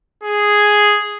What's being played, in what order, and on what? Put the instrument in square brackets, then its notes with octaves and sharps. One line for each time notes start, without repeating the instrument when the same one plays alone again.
[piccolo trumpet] G#4